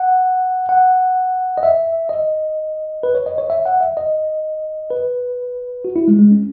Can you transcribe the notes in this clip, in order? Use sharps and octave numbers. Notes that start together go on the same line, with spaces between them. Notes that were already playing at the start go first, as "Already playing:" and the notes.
Already playing: F#5
F#5
D#5
E5
D#5
B4
C#5
D#5
C#5
E5
F#5
E5
D#5
B4
F#4
E4
G#3
G#3
C#4